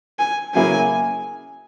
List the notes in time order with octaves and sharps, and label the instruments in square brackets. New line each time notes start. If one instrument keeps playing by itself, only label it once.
[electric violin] G#5
[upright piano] C#3 F#3 A#3 E4 G#4 [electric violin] G#5